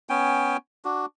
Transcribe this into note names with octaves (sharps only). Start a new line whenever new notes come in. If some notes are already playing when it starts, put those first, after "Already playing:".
B3 C#4 G5 G#5
D4 F#4